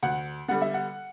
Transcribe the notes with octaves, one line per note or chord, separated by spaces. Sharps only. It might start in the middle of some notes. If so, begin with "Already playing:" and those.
D2 F#5
D3 G3 B3 F#5
E5
F#5